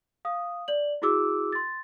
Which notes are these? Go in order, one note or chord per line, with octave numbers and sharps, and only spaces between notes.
F5 D#6
D5 F#7
E4 F#4 G#4 D6 E6
C6 A6